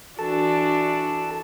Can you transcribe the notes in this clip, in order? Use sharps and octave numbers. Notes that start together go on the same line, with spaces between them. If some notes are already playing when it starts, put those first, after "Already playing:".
E3 D4 F#4 A4 A5